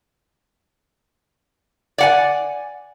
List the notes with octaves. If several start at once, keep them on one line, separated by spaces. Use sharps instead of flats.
D5 F#5 G#5